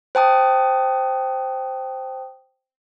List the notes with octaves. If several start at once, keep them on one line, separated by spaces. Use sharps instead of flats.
C5 G5 A5 D#6